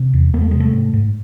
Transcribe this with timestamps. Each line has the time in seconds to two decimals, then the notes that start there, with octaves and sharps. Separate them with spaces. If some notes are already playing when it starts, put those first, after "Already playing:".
Already playing: C3
0.13 E2
0.33 E2 A#3
0.41 A3
0.51 C3 G#3
0.60 A3
0.73 G#2
0.93 G#2